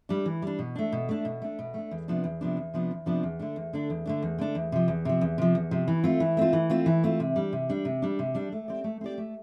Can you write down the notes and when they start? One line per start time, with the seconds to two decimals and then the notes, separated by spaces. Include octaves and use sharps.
0.09 G3 D4
0.26 E3
0.42 G3 D4
0.59 B2
0.76 A3 D4
0.92 B2
1.09 A3 D4
1.25 B2
1.42 A3 D4
1.59 B2
1.74 A3 D4
1.91 E2
2.08 C3 F3 B3 D4
2.24 E2
2.41 C3 F3 B3 D4
2.57 E2
2.74 C3 F3 B3 D4
2.91 E2
3.06 C3 F3 B3 D4
3.23 E2
3.39 D3 A3 D4
3.56 E2
3.73 D3 A3 D4
3.90 E2
4.06 D3 A3 D4
4.23 E2
4.38 D3 A3 D4
4.55 E2
4.72 C3 F3
4.88 E2
5.05 C3 F3
5.21 E2
5.38 C3 F3
5.55 E2
5.71 C3 F3
5.88 E3
6.04 A3 C4 F4
6.20 E3
6.37 A3 C4 F4
6.53 E3
6.70 A3 C4 F4
6.86 E3
7.04 A3 C4 F4
7.20 C3
7.36 G3 D4
7.53 C3
7.69 G3 D4
7.85 C3
8.02 G3 D4
8.19 C3
8.35 G3 D4
8.52 A3
8.68 C4 G4 D5
8.84 A3
9.01 C4 G4 D5
9.18 A3